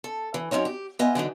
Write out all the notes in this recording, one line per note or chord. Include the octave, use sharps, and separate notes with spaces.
A4
E3
F#2 A#2 C4 D#4 C#5
G4
B3 F4 D#5 E5 G#5
D3 E3 F#3 D#4